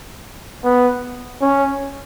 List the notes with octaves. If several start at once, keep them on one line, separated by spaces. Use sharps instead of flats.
B3
C#4